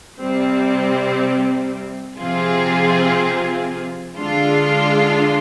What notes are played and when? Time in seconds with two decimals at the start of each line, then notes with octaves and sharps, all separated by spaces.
0.19 C3 G3 C4
2.19 C3 F3 C4 F4 G#4
4.18 D3 G#3 D4 F4